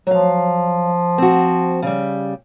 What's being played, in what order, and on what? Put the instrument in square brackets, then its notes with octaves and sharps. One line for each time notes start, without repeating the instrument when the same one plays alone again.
[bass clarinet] F3 [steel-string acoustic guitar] F#3 F5
[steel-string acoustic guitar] C4 F#4
C#3 G3